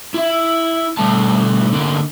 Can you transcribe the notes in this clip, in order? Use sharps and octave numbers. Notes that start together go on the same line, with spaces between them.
E4 E5
B2 G3 A3 A5
D3 A#3 B3